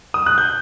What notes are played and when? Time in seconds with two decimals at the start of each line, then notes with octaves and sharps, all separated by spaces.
0.14 D#6
0.26 F#6
0.38 G6